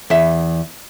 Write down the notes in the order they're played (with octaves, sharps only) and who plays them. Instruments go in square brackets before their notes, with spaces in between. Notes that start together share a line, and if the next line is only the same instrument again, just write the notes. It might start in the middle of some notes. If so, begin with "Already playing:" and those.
[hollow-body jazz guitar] E2 E5